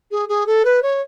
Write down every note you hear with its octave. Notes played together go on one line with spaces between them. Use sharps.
G#4
G#4
A4
B4
C#5